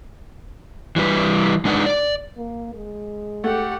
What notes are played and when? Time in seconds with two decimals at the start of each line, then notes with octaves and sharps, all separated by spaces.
0.96 E3 G3 B4
1.65 G#3 D4 D#4 B4 F5 F#5
1.86 D5
2.37 A#3
2.74 G#3
3.44 A3 G4 F#5